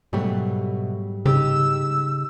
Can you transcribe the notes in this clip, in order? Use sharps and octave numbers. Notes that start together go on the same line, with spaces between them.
G#2 B2 F#3 G3 A3
C#3 D#4 G4 E6